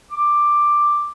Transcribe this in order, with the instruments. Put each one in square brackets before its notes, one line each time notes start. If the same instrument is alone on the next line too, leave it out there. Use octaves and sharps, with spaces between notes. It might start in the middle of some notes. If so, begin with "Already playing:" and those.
[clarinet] D6